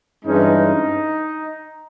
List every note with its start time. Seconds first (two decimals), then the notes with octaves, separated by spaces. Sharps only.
0.24 G2 E3 G#3 C#4 D#4